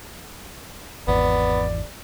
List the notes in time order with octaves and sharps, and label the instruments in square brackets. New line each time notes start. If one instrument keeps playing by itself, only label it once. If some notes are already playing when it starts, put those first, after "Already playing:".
[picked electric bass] G#1 E2 [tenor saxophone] B3 [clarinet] D5